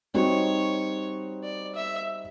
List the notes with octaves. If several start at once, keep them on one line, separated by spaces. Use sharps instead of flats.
G3 C4 D#4 F#4 C#5
D5
E5